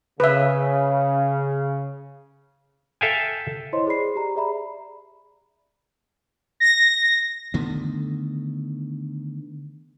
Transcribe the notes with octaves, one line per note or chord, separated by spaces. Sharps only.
C#3 B4 E5
A4 E5 F5 G5 G#5
E4 C5 C#5 D#5 C6
G#4 C5 D5 B5 C7
G4 A#5
G#4 D5 E5 A#5 B5
A#6
D3 D#3 A3 B3